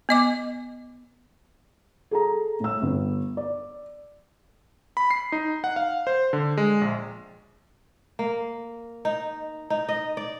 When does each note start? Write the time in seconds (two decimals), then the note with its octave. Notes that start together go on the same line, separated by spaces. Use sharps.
0.09 B3 D#5 D6
2.11 G#4 A4 A#5
2.60 A2 E6
2.82 G1
3.37 D5
4.97 B5
5.11 C7
5.32 D#4
5.64 F#5
5.76 F5
6.07 C5
6.33 D3
6.57 G#3
6.81 A#1
8.19 A#3
9.05 D#4
9.70 D#4
9.89 D#5
10.17 D5